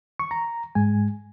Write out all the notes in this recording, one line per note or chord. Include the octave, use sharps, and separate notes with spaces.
C#6
A#5
G#2 G#3 G#5